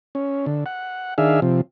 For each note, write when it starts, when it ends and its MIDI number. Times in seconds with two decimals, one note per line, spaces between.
0.15 0.46 61
0.46 0.64 50
0.66 1.14 78
1.18 1.40 51
1.18 1.40 62
1.18 1.40 68
1.18 1.40 76
1.18 1.40 77
1.42 1.61 48
1.42 1.61 53